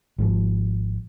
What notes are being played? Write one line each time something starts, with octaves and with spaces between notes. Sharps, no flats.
G#1 G#2 F3